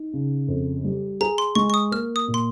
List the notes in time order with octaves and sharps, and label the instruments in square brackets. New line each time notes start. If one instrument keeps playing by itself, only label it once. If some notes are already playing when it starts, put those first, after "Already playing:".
Already playing: [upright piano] D#4
C#3
F2
G3
[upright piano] G#4 [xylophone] A#5
[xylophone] C6
[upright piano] G#3 [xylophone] C#6
[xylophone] C#6
D#6
[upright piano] A#3 [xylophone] F6
[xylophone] D#6
[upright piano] A#2
[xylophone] C6